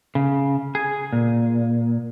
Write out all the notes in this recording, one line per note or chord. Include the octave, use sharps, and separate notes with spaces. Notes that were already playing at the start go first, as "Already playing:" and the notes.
C#3
G#4
A#2